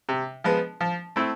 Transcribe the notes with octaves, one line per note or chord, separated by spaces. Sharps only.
C3
F3 G#3 B3
F3
A3 C4 E4